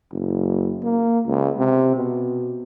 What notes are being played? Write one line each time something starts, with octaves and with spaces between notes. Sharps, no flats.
F#1
A#3
C#2
C3
B2